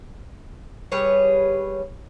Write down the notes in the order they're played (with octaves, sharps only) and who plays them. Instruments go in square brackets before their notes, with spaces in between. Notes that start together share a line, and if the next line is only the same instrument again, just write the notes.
[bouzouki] G3 G#4 B4 C#5